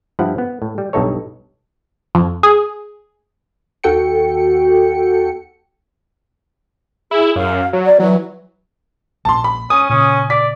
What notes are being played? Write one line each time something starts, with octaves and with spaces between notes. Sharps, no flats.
G2 F3 E4 F#5
B3
A2
G3
B1 G2 D#4 A4 C#5
F2
G#4
D#2 F#4 A4 G5 C#7
E4 G#4
F#2 F5
F#3
D5
E3 F#3
A#1 A#2 A5 C6
B5
C#4 G#5 D#6
A#2 C#3 C#4
D5 B6